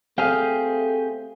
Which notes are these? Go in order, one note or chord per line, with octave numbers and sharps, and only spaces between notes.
A3 C4 G4 G#4 F5